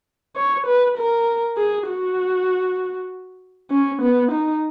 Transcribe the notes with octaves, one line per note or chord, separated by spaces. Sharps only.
C#5
B4
A#4
G#4
F#4
C#4
B3
D#4